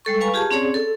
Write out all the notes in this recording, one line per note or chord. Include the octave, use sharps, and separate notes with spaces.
G3 G#3 A4 C#6
B4 F5 G#5 A#5 C#6
F4 G4 G#4 A5
C4 C#4 G#4 C#5 D5
A4